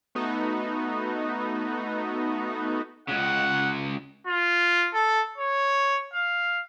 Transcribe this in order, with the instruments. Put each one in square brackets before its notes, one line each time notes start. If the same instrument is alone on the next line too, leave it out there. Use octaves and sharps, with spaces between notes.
[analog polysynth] A3 B3 D#4 F#4
[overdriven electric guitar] C#2 C#3 [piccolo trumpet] F#5
[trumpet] F4
A4
C#5
F5